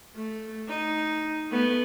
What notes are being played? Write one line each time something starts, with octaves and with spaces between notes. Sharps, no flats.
A3
D#4
A3 B3